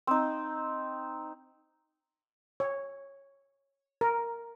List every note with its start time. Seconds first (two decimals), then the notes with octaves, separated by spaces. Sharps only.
0.07 C4 D#4
2.60 C#5
4.01 A#4